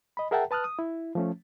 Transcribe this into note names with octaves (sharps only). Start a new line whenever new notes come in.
D#5 B5
G#4 A#4 E5 F#5 G5 A5
B4 A5 D#6 F6 F#6
D#6
E4
F3 A3 C#4